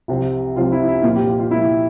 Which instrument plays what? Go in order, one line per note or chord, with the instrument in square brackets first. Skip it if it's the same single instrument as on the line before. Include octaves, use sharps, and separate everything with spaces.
[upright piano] C2 C3 F3 C4
C2 C3 F3 C4 F4
E4
E4
A#2 F3 A#3 F4
G4
F4
F4
A#2 F3 A#3 E4